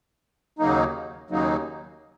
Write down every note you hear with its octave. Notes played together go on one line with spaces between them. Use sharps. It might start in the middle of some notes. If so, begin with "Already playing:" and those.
D#2 C#3 F#3 A#3 D#4
D#2 C#3 F#3 A#3 D#4